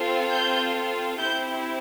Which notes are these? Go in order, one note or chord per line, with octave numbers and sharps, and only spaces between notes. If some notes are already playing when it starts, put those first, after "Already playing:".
Already playing: C4 F4 A4
G6
C4 E4 G4 G6